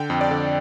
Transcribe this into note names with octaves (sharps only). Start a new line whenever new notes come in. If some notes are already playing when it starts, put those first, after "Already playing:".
Already playing: D3 G5
F2
D5
D3